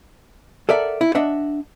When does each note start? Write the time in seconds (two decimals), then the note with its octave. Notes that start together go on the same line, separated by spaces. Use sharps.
0.69 A4 A#4 D5 E5 F#5
1.01 E4
1.15 D4 D#5 E5 F#5